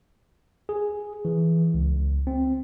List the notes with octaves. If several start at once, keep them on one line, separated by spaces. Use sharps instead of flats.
G#4
E3
C#2
C4